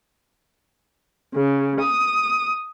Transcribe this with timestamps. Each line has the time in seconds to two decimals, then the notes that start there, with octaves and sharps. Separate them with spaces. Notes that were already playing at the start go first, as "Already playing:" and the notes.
1.35 C#3
1.79 D#6